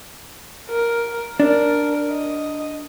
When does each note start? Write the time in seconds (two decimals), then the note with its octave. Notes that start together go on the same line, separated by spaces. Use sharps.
0.69 A#4
1.40 D4 A#4
2.11 D#5